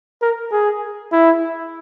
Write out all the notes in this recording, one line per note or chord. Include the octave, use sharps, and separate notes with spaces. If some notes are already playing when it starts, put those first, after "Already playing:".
A#4
G#4
E4